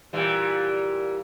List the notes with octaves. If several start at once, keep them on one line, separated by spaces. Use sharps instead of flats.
A#2 E3 G3